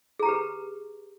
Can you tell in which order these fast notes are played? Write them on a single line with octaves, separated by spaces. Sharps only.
G#4 A#5 G4 B4